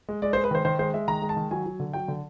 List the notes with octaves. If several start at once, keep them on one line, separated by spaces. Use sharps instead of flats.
G#3
G#3 D5
C5
G#3
B4
D#3 C5
D#3 C5
G#3 C5
G#3 E5
D#3 A#5
G#3
A5
D#3
F#3 G#5
F#3
D3
F#3 G5
D3